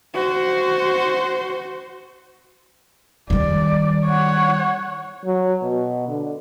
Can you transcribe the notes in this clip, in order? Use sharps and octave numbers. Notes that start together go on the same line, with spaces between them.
F#4 C5
D#3 G3 D5
C#5 F#5
F#3
B2
D3